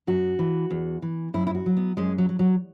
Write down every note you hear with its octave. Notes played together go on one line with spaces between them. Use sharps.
F#2 F#4
E3
E2
E3
F#2 E4
E4
F#4
F#3
B3
F#2 G#3
F#3
F#3
F#3